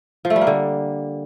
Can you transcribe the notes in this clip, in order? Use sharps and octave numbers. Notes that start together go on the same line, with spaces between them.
F3
A3
G3
A#3
D3